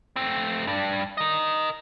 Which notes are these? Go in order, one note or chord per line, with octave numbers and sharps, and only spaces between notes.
A3 C4
G2 D4
A#4 D#5